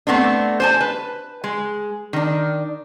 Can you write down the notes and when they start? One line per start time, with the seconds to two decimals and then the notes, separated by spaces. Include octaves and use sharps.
0.07 A3 B3 C4 D4
0.60 C5 G#5 A5
0.81 B4
1.44 G#3
2.13 D#3 D4